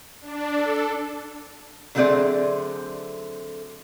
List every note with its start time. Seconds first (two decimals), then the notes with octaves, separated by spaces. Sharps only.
0.21 D4
0.55 A4
1.95 D3 F#3 A3 C4 G#4 D5